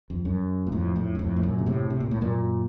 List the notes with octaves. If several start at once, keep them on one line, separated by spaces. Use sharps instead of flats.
F2
F#2
A#2
F2 A2
F2 A2
F#2
F2 A2
A2
F#2 A#2
C#3
A2 C3
C3
A#2
A2
F#2 A#2